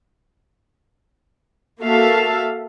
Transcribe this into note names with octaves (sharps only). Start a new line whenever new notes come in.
A#3 F#4 A4 E5 F5 A5